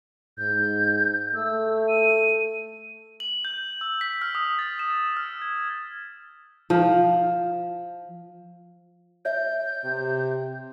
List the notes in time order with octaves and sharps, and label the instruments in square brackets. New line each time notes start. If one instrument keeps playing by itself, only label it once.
[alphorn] G#2 [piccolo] G6
[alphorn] A3 [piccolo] E6
[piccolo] D#7
[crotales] F#7
G6
E6
B6
F6
D#6
A6
E7
F6
G#6
[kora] F3
[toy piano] C#5 E5 [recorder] G6
[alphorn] C3